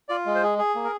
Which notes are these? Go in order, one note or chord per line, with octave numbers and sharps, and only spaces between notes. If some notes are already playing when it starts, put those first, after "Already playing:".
F4 D5
G#3
C5
G#4
G#4
A#3
A#4